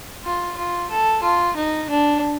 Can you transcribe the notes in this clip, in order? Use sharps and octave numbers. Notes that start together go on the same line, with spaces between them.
F4
F4
A4
F4
D#4
D4